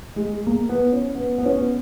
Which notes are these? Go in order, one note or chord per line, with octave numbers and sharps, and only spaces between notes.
G#3
A#3
B3
C#4
B3
B3
C#4
B3